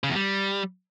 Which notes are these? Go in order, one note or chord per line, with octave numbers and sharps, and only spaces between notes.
C#3
E2
G3